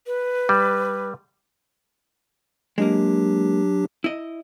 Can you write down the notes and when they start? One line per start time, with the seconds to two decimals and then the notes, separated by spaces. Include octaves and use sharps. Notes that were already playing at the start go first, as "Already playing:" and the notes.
0.07 B4
0.49 G3
2.78 F#3 G#3 A#3 D4 G4
4.04 E4 D#5